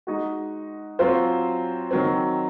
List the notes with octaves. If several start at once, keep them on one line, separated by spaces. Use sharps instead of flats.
G#3 D#4 F#4
F#3 C4 F4 C5
D#3 F#3 C4